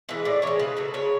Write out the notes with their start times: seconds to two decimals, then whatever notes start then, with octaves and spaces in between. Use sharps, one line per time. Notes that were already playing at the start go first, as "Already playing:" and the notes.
0.09 E3 G#3 B4
0.25 A2 D5
0.42 E3 G#3 C#5
0.59 C#3 B4
0.77 F#3 A3
0.94 C#3 C#5